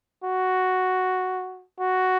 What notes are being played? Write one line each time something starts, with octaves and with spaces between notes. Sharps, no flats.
F#4
F#4